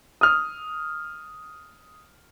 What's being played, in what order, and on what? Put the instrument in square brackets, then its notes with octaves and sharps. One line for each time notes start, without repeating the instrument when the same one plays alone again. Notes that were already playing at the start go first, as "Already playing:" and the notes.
[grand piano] D#6 F6